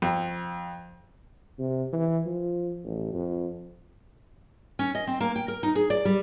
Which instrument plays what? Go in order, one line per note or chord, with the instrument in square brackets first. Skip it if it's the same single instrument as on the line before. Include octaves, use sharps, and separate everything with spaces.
[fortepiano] F2
[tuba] C3
E3
F3
A1
F2
[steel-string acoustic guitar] C#4
D#5
C4
A#3
G5
A#4
D#4
G#4
D5
G3